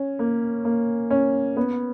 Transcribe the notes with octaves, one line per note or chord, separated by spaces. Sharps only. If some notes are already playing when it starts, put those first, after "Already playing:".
Already playing: C#4
A#3
A#3
C#4
B3